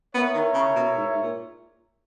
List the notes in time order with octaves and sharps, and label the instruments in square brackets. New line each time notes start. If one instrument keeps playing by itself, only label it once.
[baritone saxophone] B3 [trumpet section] E4 A#4 C#5 E5
[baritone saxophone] D#3
C#3
B2
G#2
G#2
A#2